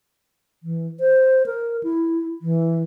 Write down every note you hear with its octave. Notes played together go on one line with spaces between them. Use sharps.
E3
C5
A#4
E4
E3